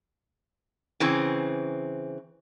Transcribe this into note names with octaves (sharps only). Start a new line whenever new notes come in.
C#3 E3 C4